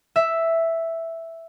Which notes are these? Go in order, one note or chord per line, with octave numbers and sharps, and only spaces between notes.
E5